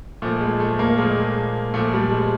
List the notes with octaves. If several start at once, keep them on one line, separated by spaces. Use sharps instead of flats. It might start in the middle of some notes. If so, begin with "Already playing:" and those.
A#2 F3 A3
G#3
A3
A#3
A#2 F3 G#3
A#2 F3 A3
G3
G#3